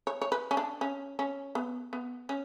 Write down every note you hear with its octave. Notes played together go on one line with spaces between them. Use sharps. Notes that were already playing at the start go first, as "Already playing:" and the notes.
C#5
C#5
B4
C#4
D4
C#4
C#4
B3
B3
C#4